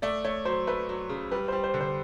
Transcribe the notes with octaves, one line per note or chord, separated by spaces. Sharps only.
A3 D5
A3 C#5
F#3 C5
A3 B4
F#3
C#3
G3 B4
G3 C5
C5
D3
C5